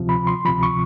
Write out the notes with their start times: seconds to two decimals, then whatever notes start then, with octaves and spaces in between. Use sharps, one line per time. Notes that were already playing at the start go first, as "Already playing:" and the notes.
Already playing: D2 C3 F3
0.09 B5
0.27 C6
0.45 D2 C3 F3 B5
0.63 C#6